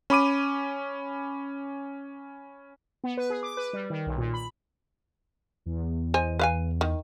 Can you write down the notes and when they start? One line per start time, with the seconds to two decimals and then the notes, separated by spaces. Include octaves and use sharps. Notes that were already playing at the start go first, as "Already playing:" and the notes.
0.10 C#4 B5 D6 D#7
3.04 B3
3.17 B4
3.30 G#4
3.43 D6
3.57 B4
3.73 G3
3.90 D#3
4.07 B1
4.18 A#2
4.34 B5
5.66 E2
6.14 C5 D#5 G#5
6.39 B4 F5 G#5
6.81 D#3